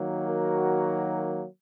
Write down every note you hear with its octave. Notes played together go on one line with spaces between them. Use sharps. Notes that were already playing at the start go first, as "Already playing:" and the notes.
Already playing: D#3 F#3 A#3
F#4 A#4